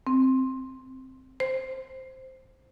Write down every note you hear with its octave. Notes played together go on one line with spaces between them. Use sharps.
C4
C5